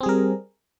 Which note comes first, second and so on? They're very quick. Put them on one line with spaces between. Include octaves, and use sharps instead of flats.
C4 G#4 G3 A#4